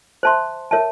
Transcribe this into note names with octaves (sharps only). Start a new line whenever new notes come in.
C5 E5 A5 C6
A#4 C#5 E5 A5